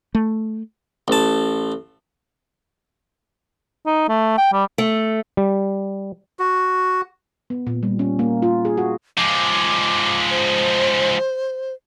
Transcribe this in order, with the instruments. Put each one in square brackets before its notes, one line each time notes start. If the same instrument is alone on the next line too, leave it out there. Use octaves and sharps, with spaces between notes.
[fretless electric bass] A3
[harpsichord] A1 A5
[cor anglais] D#4
A3
G5
G3
[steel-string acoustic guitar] A3
[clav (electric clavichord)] G3
[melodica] F#4
[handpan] B3
A#2
G3
C#4
A#3
F4
G#4
F#4
[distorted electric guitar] F3 G#3 [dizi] D6
[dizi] C5